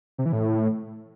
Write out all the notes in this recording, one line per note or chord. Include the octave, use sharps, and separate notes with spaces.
C3
E3
A2